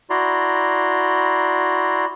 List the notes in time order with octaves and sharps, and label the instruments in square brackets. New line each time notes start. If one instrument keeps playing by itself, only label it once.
[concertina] E4 F#4 D5 A#5 C6